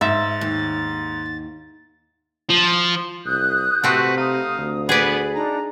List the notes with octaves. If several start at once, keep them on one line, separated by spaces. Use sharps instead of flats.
G#2 E5 A6
D#2
F3
C2 D#6 F#6 G6
C3 A3 C4 F#4 B4
D#4 F5 D#6
D2
B3 G#4 B4 D5
D4 D#4 A#5